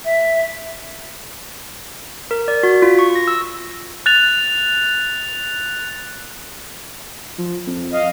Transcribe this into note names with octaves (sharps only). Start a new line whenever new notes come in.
E5
A#4
D5
F#4
F4
C#6
A#6
E6
F#6 A6 F7
F3
F2
D#5 F5